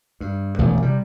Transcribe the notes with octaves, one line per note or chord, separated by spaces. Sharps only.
G2
E1 A1 F#2 D#3
C3 G3